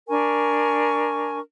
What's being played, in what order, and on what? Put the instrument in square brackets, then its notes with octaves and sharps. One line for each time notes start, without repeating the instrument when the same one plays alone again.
[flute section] D4 A#4 G#5 C#6